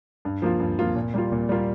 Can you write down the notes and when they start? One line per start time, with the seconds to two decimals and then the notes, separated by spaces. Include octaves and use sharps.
0.25 G2
0.42 F3 A#3 F4
0.60 G2
0.79 F3 A#3 F4
0.95 A#2
1.14 G3 A#3 F4
1.32 A#2
1.49 G3 A#3 F4